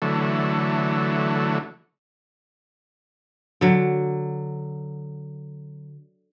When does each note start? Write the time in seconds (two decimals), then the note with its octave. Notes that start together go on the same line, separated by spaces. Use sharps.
0.02 D3 E3 F#3 A3
3.61 D3 F#3